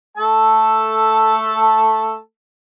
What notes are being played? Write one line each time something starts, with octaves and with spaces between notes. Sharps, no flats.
A3 A4 A5